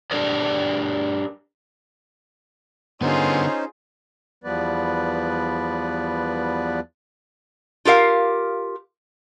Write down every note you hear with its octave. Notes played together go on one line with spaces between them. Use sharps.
D4 G4 A4 A#4 D5 D#5
D3 B3 C#4 D#4 F4 G#4 C5
E2 F3 G3 B3 B4 D5
F4 G4 A#4 F5